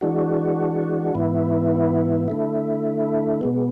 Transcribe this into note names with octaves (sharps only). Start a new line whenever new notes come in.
E3 G#3 D4 F#4
G#2 E3 B3 E4
D3 A3 E4
B2 G#3 B3